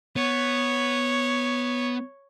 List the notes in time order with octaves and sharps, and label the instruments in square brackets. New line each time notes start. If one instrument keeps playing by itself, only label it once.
[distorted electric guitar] B3 [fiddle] C#5